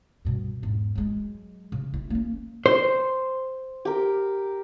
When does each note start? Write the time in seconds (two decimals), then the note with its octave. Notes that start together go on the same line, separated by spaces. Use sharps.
0.25 G2 B2
0.62 E2 G#2
0.95 F#3 G#3
1.72 C#3
1.94 E4
2.10 A#3 C#4
2.66 C5
3.85 G4 A#4